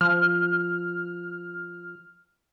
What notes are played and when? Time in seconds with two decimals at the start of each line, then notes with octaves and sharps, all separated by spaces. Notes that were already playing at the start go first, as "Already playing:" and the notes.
0.01 F3 F6